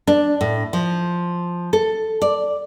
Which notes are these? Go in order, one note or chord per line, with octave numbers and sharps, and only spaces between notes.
D4
A2
F3
A4
D5